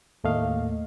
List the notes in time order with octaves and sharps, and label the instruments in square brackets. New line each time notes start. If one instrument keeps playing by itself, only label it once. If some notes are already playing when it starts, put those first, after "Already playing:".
[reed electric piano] D#2 A2 A3 A#3 D#5 F5